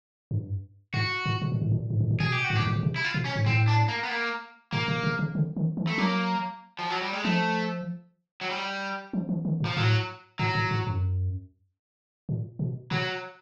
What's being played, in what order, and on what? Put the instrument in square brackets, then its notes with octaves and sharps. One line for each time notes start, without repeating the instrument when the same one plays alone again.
[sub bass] G2
[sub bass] G#2 [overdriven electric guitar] F#4
[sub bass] A2
B2
A#2
A2
A#2
G#2
A2
A#2
[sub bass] B2 [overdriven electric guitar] G#4
[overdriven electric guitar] G4
F#4
[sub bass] G#2
[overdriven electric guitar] G4
[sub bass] A2
A#2
B2
C3
[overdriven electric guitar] E4
F4
[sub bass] B2
[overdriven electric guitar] C#4
[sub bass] G#2
[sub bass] A2 [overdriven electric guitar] C4
[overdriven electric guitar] D4
A#3
B3
A#3
[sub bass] A#2 [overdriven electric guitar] A#3
[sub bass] B2
C3
C#3
D3
D#3
E3
[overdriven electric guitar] A3
[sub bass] F#3 [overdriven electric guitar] A#3
[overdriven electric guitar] F3
F#3
G3
G#3
[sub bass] F3 [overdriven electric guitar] A3
[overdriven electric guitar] F#3
G3
[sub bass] F3
E3
D#3
A#2
[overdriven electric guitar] F3
[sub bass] A2 [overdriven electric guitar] F#3
[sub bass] A2 [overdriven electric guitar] F#3
[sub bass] A2
G#2
F#2
A#2
B2
[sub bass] B2 [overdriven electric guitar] F#3